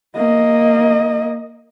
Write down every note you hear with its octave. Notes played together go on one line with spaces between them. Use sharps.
A#3 D#5